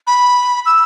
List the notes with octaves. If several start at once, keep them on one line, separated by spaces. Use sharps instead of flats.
B5
E6